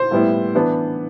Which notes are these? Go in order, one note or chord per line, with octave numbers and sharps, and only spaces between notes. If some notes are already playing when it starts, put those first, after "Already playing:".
Already playing: C5
A2 G3 B3 E4
E3 B3 D4